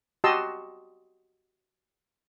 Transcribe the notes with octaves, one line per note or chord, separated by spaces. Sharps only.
F#4 G4 D#5 A5 C6 E6